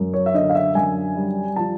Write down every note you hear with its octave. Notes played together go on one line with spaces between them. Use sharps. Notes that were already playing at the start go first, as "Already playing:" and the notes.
Already playing: F#2
C#5
E5
D3 D#5
F5
E5
F#2 G#5
G3
F3 A5